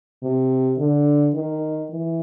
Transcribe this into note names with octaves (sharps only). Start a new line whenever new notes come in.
C3
D3
D#3
E3